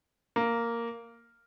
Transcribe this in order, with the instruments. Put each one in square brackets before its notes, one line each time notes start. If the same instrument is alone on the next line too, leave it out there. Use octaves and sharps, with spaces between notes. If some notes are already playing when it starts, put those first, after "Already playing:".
[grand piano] A#3